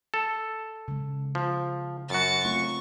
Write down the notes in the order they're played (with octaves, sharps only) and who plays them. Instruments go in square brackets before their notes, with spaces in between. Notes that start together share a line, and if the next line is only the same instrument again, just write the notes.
[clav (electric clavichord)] A4
[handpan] C#3 G#3
[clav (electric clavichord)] F3
[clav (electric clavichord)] F#2 F#4 [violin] A6 C#7
[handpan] A3 C4 F4 [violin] C#6